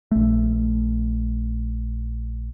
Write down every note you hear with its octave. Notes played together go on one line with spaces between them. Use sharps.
A#1 A3